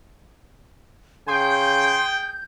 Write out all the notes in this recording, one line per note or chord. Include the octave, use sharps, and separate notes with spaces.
C#3 G#4 G5 C6 G6